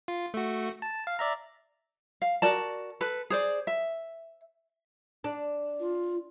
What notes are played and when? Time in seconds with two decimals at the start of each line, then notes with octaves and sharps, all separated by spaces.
0.08 F4
0.34 A3 F#4
0.82 A5
1.07 F5
1.19 D5 E5 A#5
2.22 F5
2.42 F#4 A#4 D5 A5
3.01 A4 B4
3.30 G#4 C5 D5
3.67 E5
5.24 D4
5.80 F4